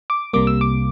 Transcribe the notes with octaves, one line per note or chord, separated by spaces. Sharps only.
D6
C2 C3 G3 A#3 D6
E6
D6